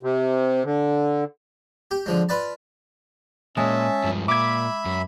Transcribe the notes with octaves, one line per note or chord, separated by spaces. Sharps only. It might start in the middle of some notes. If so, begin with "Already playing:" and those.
C3
D3
G4
D3 F3 G#3
F4 B4 D5 A5
A#2 G#3 C#4 E5 A5
G2 F3
A#2 E5 B5 D6 G#6
F#2